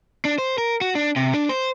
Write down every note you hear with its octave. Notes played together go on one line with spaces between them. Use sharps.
D4
C5
A#4
F#4
D4
C3
D4
C5